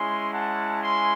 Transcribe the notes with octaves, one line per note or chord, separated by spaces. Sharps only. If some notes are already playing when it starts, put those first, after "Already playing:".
Already playing: G#3 C#4 E4 G#5 C6
F#5 A5
G#5 C6